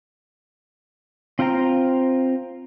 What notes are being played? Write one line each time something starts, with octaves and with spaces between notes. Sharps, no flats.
C4 F4 C5 G5 A#5